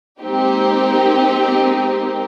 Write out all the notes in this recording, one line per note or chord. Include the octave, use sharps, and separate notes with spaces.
G#3 A#3 C4 D#4 G4